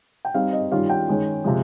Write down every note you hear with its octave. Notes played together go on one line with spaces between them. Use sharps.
G5
G3 C4 D#4 F5
D#5
D#3 G3 C#4 F4 F5
G5
D#3 G#3 C#4
C3 F3 G#3